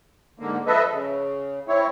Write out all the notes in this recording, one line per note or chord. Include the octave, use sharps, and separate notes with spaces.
G#2 D3 A#3
F3 A4 B4 D#5 E5
C#3
C4 E4 C#5